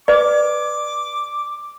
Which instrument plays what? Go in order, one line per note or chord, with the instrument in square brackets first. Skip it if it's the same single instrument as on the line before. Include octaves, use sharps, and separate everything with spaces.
[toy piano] B4 D5 [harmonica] D6